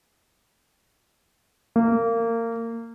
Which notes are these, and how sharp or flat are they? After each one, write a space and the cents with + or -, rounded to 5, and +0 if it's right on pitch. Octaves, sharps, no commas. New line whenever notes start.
A#3 -25